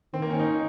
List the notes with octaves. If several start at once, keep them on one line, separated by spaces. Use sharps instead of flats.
D#3 C4
A#3
C#4
D#4